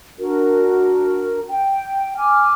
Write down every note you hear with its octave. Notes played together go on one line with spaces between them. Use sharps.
D4 F#4 A#4
G5
G#5 D6 F6